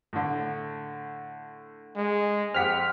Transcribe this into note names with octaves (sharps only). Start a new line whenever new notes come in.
A2 D3
G#3
F2 C4 G4 F#5 F6 B6